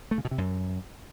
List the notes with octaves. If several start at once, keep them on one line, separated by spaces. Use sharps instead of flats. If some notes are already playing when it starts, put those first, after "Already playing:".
A3
C#3
B2
C3
F#2